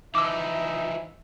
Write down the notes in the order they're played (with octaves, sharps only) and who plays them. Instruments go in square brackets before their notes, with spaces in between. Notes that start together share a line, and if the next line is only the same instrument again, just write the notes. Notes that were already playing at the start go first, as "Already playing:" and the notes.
[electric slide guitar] E3 F3 [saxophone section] D#4 [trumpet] E5 [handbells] D6 E6